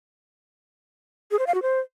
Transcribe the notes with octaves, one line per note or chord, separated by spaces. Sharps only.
G#4
C5
F5
F#4
C5